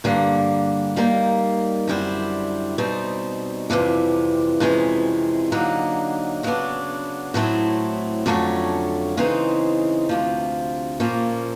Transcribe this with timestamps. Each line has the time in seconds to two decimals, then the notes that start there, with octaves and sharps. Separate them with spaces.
0.04 G2 D3 G3 A#3
0.96 D#3 G3 A#3
1.87 F#2 D3 G3 C4 E4
2.78 B2 G3 C4 D#4
3.70 F2 C3 E3 G3
4.60 F2 C3 E3 G#3 C#4
5.52 D3 F#3 A#3 D#4
6.43 C#3 F#3 B3 D4
7.34 A2 F#3 A3 C4 E4
8.26 F2 D3 F#3 A3 C#4
9.17 C#3 E3 G#3 C4 D#4
10.09 D2 C3 F3
11.00 A#2 F3 A#3 C#4